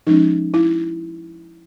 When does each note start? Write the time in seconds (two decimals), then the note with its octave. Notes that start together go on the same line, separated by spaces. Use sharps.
0.07 F3 G#3 C#4 D#4
0.54 E4